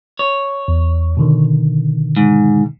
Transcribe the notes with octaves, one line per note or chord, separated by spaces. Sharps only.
C#5
E2
B2 D3 D#3
G#2